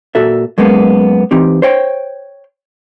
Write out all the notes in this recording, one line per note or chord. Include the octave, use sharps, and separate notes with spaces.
A#2 F#4 A4 E5
F#2 G#3 A#3 B3
E3 C4 D#4 G4
C5 C#5 G5